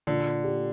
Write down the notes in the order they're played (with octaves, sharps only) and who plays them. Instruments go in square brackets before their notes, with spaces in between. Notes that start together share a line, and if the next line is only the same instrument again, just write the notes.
[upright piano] A#2 [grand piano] D3
[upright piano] G4